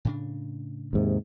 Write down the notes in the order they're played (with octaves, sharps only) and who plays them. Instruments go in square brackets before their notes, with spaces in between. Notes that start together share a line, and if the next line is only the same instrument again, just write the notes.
[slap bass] A2 C#3 D4
[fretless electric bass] D#2 G#2 C3